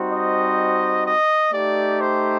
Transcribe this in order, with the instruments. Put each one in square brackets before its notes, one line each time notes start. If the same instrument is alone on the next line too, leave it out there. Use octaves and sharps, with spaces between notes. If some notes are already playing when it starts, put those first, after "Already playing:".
Already playing: [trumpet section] G3 C4 D#4 F#4 C5
[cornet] D#5
D#5
[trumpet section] A3 D#4 G4 [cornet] D5
[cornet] C5